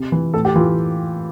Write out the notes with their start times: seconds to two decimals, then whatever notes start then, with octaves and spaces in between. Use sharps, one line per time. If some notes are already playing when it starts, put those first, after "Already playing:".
Already playing: C3
0.12 E3
0.34 A2 A4
0.45 G4
0.55 E3 F4